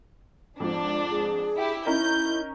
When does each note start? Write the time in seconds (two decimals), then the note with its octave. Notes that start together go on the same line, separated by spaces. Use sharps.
0.60 F2 G#2 F3 D4
1.10 G#4
1.55 E4 G4
1.86 C#4 D#4 E4 A#4 G6